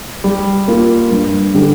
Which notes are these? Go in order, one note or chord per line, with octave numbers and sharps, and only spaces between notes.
G3
A#3 F4
G2
D3 G3 D4 G4